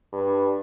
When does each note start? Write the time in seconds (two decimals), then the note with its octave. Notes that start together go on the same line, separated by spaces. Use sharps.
0.13 G2